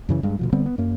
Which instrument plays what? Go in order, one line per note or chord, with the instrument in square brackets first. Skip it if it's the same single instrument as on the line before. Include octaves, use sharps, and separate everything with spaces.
[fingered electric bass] F#2 C#3 E3
G2 G#3
D2 B2 F3
D3 G3 B3 C4
B3
F#2 A#3